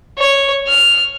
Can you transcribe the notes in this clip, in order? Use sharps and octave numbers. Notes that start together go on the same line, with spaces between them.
C#5
F6